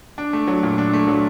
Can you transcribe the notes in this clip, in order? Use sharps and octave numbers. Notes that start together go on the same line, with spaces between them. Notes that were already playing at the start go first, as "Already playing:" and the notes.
D4
A3
F#3
A#2
D4
A3
F#3